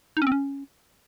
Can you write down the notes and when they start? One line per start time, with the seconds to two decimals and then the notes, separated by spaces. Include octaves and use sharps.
0.17 D#4
0.22 C#4
0.27 C4
0.32 C#4